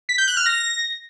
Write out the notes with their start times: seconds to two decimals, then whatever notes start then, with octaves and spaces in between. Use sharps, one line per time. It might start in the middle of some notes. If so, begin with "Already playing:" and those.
0.09 B6
0.18 G6
0.27 F#6
0.37 F6
0.46 A#6